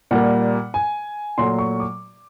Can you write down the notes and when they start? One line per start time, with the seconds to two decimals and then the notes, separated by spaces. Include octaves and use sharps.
0.11 A#2 G3 A#3 F#5
0.74 G#5
1.38 A#2 F#3 A3 C6
1.58 C#6
1.80 D6